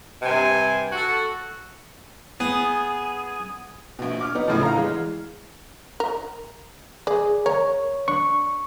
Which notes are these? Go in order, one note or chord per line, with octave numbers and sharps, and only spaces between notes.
G2 C3 C5 G#5
F#4 A4
B3 G#4
A#1 B2
D6 F6
B3 D#4
A#1 A2 C#3 F3
F5 F#5 A#5 F6
E3 G#3
A#4
G#4 D5
A#4 C#5
D4 C#6